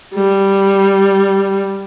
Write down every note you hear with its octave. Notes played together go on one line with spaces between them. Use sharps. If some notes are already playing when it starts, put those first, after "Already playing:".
G3